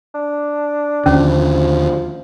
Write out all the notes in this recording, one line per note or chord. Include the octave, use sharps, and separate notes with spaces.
D4
D#2 D3 F3 C#4